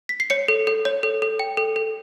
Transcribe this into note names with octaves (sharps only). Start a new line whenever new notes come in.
B6
C7
C#5 C#7
A4
A4
C#5
A4
A4
G5
A4
A4